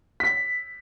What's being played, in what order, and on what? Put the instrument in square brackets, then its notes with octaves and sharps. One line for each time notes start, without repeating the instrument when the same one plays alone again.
[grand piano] B6